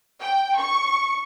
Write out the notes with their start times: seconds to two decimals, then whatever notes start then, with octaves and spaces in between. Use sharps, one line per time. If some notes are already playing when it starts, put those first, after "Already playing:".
0.21 G5
0.59 C#6